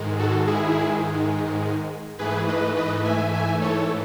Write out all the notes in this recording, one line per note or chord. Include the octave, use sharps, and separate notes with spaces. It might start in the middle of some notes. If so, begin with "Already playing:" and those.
Already playing: G#2 D#3 G#3
F#4 A4
E4 G#4
G#2 E3 A3 G#4 B4
B4 D#5
B4 D#5
E5 G#5
E5 G#5
A4 C#5